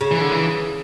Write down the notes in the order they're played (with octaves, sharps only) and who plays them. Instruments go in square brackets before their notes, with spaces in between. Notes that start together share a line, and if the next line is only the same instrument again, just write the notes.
[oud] C#3
[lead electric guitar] E3
D3
E3